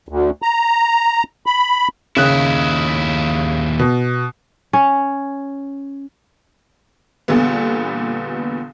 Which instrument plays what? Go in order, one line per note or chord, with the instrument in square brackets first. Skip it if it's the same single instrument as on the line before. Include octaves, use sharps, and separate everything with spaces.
[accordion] D2
A#5
B5
[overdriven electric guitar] D#2 E4 [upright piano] C#3 F#6
[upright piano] B2
[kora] C#4
[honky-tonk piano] E2 A#2 D3 G3 B3